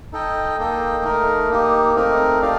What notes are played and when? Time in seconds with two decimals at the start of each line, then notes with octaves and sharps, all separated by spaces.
0.12 D#4 A4 D#5 G5
0.58 A#3 D#4 A4 D#5 G5
1.04 A3 D#4 A#4
1.50 A#3 D#4 G4
1.96 A3 C4 D#4 A#4
2.42 A3 D#4 G4 D5 F5